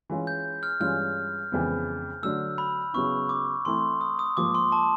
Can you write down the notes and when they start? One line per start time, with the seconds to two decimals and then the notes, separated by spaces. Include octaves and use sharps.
0.10 E3 G#3 C#4 F4
0.27 G6
0.63 F6
0.80 G2 E3 G#3 C#4 F4 F6
1.52 F2 C#3 E3 G#3 B3
2.22 D3 F#3 A3 E6
2.58 B5
2.94 C#3 F#3 B3 E4 C#6
3.29 D6
3.65 E3 A3 C4 E4 C6
4.01 D#6
4.19 D#6
4.37 G#2 F3 A#3 D6
4.55 C6
4.72 A5